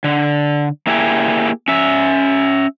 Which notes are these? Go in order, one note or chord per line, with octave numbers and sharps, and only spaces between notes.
D3
A#3 E4 G4 G#4
C#4 E5